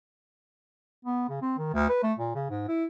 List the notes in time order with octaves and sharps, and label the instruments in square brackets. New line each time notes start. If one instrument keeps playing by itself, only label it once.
[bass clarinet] B3
C#3
C4
D#3
D2
B4
A3
A#2
C#3
G#2
E4